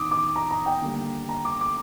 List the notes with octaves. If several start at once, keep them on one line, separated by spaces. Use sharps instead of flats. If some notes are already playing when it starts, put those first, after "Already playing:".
Already playing: D#3 D6 D#6
D6
A#5
A#5
G5
D3 G3 A#3
A#5
D6
D6